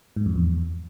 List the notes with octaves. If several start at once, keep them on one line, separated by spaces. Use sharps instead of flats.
G#2
F2
E2